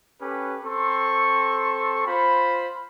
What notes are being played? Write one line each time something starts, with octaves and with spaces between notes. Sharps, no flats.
C#4 G4 A4 B4
C4 A4 C6 C#6
F4 C5 B5